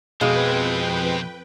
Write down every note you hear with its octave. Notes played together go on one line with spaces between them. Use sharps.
F2 B2 F3 G#3 C4 B4 F5 G5